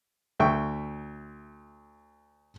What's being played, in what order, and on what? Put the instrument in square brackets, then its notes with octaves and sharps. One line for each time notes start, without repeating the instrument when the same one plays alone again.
[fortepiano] D2 E5 G5 C#6